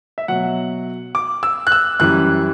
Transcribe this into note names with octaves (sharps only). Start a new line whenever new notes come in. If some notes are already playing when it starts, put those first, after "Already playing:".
E5
B2 F#3 F#5
D6
E6
F#6
E6
F#2 E3 G3 F#6